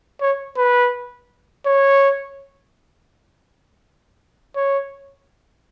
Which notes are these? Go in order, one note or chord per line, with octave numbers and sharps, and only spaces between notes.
C#5
B4
C#5
C#5